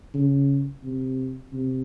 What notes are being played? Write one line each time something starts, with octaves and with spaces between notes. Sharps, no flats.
C#3
C3
C3